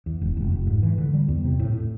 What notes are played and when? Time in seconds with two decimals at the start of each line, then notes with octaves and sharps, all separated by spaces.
0.06 E2
0.21 E1
0.37 F1
0.52 F1
0.67 G#2
0.83 E3
0.98 D3
1.14 G3
1.28 E2
1.44 C3
1.59 A2
1.74 A2